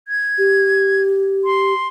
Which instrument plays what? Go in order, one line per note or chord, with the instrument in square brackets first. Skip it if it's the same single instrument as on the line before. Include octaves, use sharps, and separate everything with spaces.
[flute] G#6
[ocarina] G4
[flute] C6